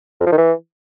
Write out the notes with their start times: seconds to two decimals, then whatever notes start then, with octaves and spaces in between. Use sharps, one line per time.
0.20 F2
0.26 F3
0.32 D#3
0.38 E3